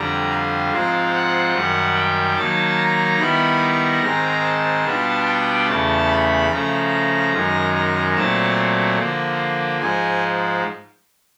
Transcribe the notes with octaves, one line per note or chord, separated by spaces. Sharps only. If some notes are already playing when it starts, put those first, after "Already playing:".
Already playing: F2 D3 G3 A#5
F5
G#2 F3 G#3 C4 F4
F#5
F#2 D#3 G3
G5
D#3 F#3 A#3 D#4 A5
A#5
D#3 G3 B3 E4 B5
A#5
G#2 D#3 G#3 C4
A5
B2 G3 B3 D4 F4
G5
E2 C#3 E3 A3 A5
B5
C#3 F3 A3 A#5
F#2 D#3 G#3
A#5
A#2 F#3 A3 C4 A5
D3 F3 A#3
G#2 F3 G#3 G#5